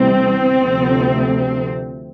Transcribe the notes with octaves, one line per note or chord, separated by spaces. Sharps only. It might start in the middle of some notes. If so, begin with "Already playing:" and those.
Already playing: D2 C3 E3 G3 C4
D2 C3 F3